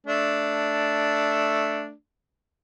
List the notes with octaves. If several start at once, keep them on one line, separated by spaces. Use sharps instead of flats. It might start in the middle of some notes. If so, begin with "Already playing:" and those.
A3 D4